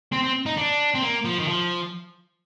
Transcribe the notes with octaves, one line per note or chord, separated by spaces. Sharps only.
C4
C4
D#4
D4
C4
A#3
F3
D#3
F3